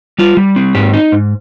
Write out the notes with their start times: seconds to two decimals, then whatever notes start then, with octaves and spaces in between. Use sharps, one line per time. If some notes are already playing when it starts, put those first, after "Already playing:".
0.19 G3 F4
0.37 G3
0.56 C4
0.75 G#2 G4
0.94 D#4
1.12 G#2